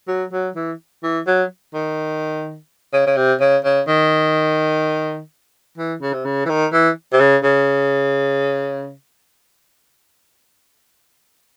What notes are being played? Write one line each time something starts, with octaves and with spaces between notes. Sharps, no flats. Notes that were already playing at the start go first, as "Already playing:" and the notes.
F#3
F#3
E3
E3
F#3
D#3
C#3
C#3
C3
C#3
C#3
D#3
E3
C#3
C3
C#3
E3
D#3
E3
C3
C#3
C#3